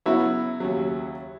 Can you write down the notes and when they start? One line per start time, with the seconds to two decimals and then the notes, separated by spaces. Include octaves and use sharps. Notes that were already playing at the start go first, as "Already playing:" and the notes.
0.06 C#3 F#3 B3 E4 F#4 C#5
0.60 D#2 C#3 F#3